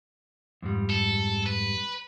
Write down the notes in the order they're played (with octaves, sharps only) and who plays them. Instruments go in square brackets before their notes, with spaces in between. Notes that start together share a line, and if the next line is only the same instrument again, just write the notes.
[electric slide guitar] F2 G#2 G3
[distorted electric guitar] A4
B4